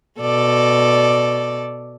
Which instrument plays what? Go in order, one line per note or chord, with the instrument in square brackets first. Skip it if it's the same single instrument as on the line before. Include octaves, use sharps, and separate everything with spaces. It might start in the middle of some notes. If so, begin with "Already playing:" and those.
[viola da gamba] B2 A4 D5